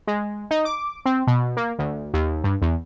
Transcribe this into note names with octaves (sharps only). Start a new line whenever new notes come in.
G#3
D#4
D6
C4
B2
A#3
D2
D#2
G2
E2